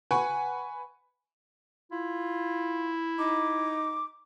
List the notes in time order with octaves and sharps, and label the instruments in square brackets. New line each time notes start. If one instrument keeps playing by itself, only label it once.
[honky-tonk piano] B4 F#5 G#5 C#6
[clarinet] E4 [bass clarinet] F4
[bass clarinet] D#4 [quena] D6